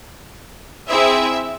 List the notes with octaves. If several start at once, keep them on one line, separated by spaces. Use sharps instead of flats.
C4 E4 G#4 E5